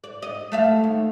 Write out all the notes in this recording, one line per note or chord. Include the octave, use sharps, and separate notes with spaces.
D5
D#5
A3 E5 F5
D#2